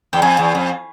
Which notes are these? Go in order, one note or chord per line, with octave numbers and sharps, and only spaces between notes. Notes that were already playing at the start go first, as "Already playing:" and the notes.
E2 G5
F2 G#5
E2
F2